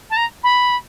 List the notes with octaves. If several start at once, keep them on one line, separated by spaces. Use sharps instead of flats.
A5
A#5
B5